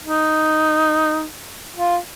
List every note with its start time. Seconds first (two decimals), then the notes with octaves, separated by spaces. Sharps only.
0.04 D#4
1.76 F4